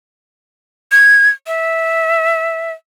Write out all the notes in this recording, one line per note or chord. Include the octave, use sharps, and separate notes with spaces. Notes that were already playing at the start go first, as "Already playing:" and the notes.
G#6
E5